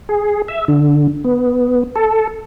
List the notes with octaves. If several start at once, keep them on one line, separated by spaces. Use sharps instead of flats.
G#4
E5
D3
B3
A4